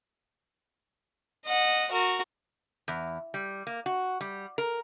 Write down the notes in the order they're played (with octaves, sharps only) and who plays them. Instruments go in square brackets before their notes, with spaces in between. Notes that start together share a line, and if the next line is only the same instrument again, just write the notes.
[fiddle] D#5 F#5
F#4 A#4
[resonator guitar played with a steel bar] E2
G3
A#3
F#4
G3
A#4